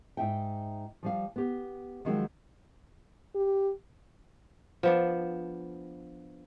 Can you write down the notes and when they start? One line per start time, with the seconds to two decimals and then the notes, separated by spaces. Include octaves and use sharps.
0.17 G#2 D#4 E5 G5
1.03 F3 G3 F5
1.36 B3 G4
2.05 D#3 F3 F#3 G#3 C4 D#4
3.35 G4
4.83 F3 B3 D4